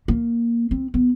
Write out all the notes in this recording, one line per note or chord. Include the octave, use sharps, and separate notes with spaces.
A#3
C4
B3